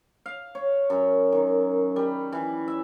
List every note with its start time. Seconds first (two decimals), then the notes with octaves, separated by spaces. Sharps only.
0.26 F5
0.55 C#5
0.90 F#2
1.32 D#3
1.96 G3
2.32 E3
2.68 E5